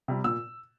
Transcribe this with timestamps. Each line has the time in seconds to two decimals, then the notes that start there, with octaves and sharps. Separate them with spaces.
0.08 C3 G3
0.24 A#2 E6